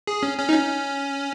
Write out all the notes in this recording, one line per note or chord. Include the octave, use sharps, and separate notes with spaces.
G#4
C#4
C#4
D#4
C#4